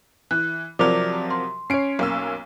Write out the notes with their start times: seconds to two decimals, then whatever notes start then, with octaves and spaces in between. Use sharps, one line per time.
0.31 E3 F#6
0.79 C3 F3 F#3 A#4 D5 D6 F7
1.30 C6
1.70 C#4 C#5 C7 D7
1.99 B1 A#3 E6